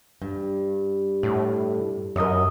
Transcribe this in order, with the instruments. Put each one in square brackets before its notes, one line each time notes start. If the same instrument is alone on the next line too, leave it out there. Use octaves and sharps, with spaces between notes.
[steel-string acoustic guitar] G2
[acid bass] A2
[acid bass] F#2 [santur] A#4 D#5 E5